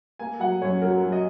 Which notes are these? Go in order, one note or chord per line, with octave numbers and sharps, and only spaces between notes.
A#3 G#5
F#3 F#5
F#2 C#5
F#3 A#4
F#3
D#5